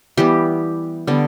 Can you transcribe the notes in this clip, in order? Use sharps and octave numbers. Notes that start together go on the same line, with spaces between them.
E3 G3 B3 G4
D3 G3 B3